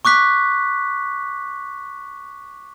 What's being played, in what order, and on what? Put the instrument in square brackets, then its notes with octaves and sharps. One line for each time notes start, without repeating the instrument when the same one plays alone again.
[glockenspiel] C#6 D6 F#6 B6